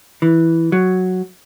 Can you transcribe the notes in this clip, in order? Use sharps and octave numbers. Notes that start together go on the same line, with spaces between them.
E3
F#3